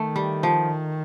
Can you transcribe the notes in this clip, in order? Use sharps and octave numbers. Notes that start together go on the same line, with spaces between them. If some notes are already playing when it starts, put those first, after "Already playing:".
Already playing: D#3 A3
G3
F3